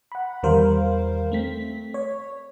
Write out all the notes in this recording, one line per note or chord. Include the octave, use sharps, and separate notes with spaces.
F#5 B5
E2 D#3 G3 A#4 C5 F5
A3 C4 B6
C#5